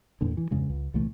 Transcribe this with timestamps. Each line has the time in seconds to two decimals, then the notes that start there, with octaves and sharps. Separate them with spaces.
0.21 E2 G2 A#2 D3
0.37 E3
0.51 E2 G2 C#3 G#3
0.70 C#2
0.94 C2 A#2 E3 A3